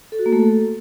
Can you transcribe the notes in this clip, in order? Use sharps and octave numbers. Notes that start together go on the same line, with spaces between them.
A4
F#4
A#3
A3
A4